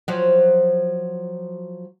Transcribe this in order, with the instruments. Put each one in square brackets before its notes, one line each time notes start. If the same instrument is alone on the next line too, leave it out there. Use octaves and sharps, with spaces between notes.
[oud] F3 F#3